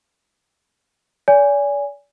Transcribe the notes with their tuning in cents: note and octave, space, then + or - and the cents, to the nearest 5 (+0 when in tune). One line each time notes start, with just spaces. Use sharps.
D5 -40 G#5 -15